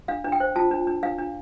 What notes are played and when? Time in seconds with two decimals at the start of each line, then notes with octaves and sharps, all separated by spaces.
0.08 D4 F5
0.24 D4
0.32 G5
0.40 C5
0.56 F4 A5
0.71 D4
0.87 D4
1.03 D4 F5
1.19 D4